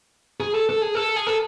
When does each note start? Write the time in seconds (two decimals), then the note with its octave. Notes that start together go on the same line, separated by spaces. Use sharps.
0.40 G#4
0.54 A4
0.69 A4
0.82 G#4
0.95 A4
1.16 G#4
1.27 A4